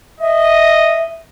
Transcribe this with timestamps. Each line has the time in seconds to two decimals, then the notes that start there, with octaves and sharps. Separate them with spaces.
0.20 D#5 E5